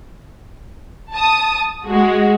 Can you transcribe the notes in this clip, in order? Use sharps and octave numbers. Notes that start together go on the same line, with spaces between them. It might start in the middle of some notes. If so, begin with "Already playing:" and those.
A5 D#6
G#3 F#4